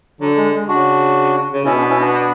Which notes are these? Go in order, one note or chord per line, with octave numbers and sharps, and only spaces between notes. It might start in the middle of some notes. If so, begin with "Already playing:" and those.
D3 F#3
G#3
G#3
C#3 D4 F#4
C#3
B2 C#4 E4
B3 D4
C#4 E4
B3 D4